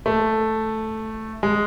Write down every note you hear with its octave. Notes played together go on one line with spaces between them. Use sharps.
A3
G#3